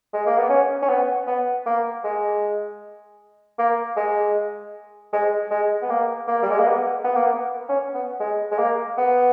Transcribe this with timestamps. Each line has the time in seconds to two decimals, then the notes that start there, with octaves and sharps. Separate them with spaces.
0.13 G#3
0.26 A#3
0.37 B3
0.49 C#4
0.82 C#4
0.89 B3
1.27 B3
1.66 A#3
2.04 G#3
3.58 A#3
3.97 G#3
5.13 G#3
5.51 G#3
5.82 B3
5.90 A#3
6.28 A#3
6.43 G3
6.50 G#3
6.59 A#3
6.66 B3
7.04 B3
7.16 A#3
7.27 B3
7.69 C#4
7.94 B3
8.20 G#3
8.51 G#3
8.58 A#3
8.98 B3